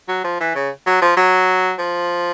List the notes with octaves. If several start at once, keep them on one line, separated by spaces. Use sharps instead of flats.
F#3
F3
E3
C#3
F#3
F3
F#3
F3